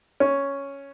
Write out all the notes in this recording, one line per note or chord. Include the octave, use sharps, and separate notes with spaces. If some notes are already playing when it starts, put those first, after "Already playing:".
C#4